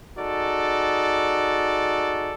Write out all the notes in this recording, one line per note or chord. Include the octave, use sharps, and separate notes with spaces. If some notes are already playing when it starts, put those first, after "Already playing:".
D#4 F#4 G#4 A4 D5